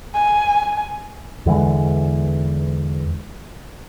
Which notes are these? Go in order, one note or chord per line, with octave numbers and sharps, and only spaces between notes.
G#5
E2 D3 E3 G#3